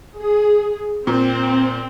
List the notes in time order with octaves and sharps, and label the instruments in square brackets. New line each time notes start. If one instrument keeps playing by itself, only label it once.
[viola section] G#4
[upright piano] A#2 [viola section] C4